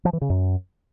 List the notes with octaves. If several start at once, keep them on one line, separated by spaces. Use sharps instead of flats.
F3
E3
C#3
F#2